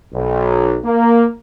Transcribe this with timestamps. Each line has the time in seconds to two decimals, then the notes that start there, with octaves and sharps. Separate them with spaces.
0.14 B1
0.84 A#3